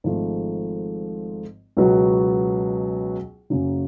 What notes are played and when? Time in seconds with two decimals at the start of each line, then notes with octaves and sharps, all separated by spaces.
0.04 G#1 G#2 F3 A3
1.77 C#2 B2 F#3 B3 F#4
3.50 F#1 F#2 C#3 F#3